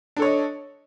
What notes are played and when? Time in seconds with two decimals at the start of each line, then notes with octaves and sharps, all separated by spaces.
0.16 D4
0.19 A4
0.22 C#5
0.25 D#5